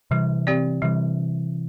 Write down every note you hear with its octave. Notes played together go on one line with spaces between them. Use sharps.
C3 E3 G3
C4 G4 D5
C3 E3 G3